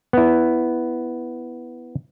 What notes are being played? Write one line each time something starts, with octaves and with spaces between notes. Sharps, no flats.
B3 E4